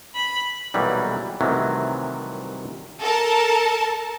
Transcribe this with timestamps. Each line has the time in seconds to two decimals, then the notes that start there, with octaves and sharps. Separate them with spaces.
0.15 B5
0.74 B1 A#2 E3 F#3 G3
1.41 C2 C3 D#3 E3 F#3 A3
3.01 A4 A#4 A5